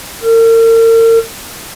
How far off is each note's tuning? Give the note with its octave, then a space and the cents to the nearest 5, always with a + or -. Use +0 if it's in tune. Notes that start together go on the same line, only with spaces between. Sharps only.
A#4 -40